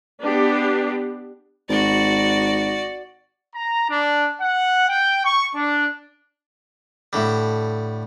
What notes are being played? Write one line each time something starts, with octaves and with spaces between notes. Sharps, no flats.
B3 D4 G4
G#1 F#4 D5
A#5
D4
F#5
G5
C#6
D4
A2 D3 G3